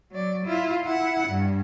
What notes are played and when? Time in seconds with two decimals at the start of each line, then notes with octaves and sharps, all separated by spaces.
0.12 F#3 D5
0.46 E4 F4
0.84 E4 F#5
1.28 G2